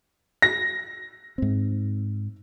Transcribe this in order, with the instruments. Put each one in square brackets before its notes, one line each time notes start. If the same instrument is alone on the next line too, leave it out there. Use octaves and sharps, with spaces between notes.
[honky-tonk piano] A#6
[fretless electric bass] G#2 C4